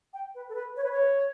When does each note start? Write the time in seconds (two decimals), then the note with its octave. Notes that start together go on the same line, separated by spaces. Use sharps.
0.13 G5
0.35 B4
0.49 A4
0.55 B4
0.77 C#5
0.83 B4
0.92 C#5